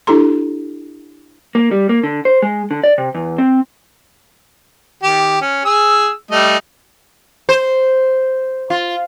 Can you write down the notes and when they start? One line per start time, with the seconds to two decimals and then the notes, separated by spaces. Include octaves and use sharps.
0.07 D4 E4 G4 A4 A#5 C6
1.55 A#3
1.71 G3
1.89 A#3
2.03 D3
2.25 C5
2.42 G#3
2.71 D3
2.84 D5
2.98 C3
3.15 E2
3.38 C4
5.03 D#3 G4
5.42 C#4
5.65 G#4 E6
6.31 G3 A3 D#5
7.49 C5
8.70 F4